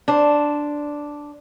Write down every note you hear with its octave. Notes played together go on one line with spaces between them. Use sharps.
D4 C5